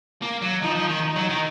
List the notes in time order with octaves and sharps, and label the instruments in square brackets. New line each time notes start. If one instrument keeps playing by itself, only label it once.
[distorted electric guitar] A#3
F#3
[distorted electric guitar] F3 [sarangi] D#4
[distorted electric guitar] F3
D#3
[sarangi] D#4
[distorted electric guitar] F#3
D#3